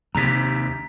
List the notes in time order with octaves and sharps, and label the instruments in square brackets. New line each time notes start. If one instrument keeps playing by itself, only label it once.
[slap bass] D#2 C3 [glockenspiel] A#5 B6